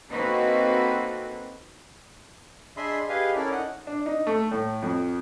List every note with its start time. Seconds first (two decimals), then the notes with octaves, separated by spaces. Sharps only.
0.11 A#3 C4 D#4 F#4 A4 B4
2.77 D4 G#4 D#5 E5 B5 C6
3.09 G4 G#4 B4 D#5 F5 G#5
3.35 C#4 E4 A4 A#4 D5
3.52 D#4 D#5 F#5
3.87 D4
4.06 D#4
4.27 A3
4.51 A2
4.82 F2